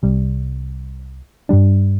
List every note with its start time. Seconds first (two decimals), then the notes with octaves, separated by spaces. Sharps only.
0.03 C2 C3 G3
1.49 G2 G3 D4